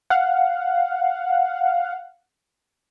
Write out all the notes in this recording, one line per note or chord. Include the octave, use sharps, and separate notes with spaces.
F5 F#5